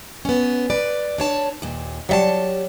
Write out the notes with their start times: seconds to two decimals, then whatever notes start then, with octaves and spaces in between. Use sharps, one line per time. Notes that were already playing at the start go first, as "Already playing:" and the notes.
0.25 B3 C#4
0.70 B4 D5
1.18 D4 C#5 A5
1.62 D#2 A#2
2.09 F#3 G3 G4 C#5 E5 A5